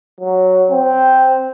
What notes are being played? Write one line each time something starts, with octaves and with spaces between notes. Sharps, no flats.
F#3
C4